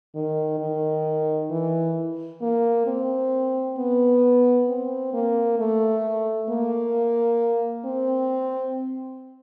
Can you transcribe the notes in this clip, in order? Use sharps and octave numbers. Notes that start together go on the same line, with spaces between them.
D#3
D#3
E3
A#3
C4
B3
C4
A#3
A3
A#3
C4